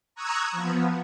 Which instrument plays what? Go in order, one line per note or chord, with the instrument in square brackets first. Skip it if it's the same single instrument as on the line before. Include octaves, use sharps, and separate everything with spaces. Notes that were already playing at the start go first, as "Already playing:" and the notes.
[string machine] A#5 C#6 D#6 E6 F#6 G#6
F3 B3